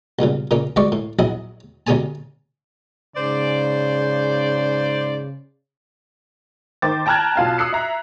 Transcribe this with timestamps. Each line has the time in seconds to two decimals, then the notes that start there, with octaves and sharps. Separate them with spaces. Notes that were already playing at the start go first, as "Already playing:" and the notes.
0.19 B1 G2 A#2 C#3
0.51 A#2 C#3 A#3 C#4
0.76 D2 G2 G#3 D5 C#6
0.92 A2
1.19 A#1 F#3 E4 G#4 D#5
1.87 D2 C3 C#4 G#4 G#5 A5
3.16 G#2 C#3 C5 D5
6.82 D#3 C5 D6 A6
7.06 G5 A5 A#5 F6 F#6 G#6
7.36 B1 F4 F5 A5
7.58 D#6 E6 F#6 C7 C#7
7.73 E5 A#5